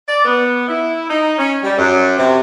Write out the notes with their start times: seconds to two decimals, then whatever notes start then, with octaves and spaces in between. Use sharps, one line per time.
0.07 D5
0.25 B3
0.68 E4
1.09 D#4
1.38 C#4
1.63 G3
1.77 F#2
2.17 C3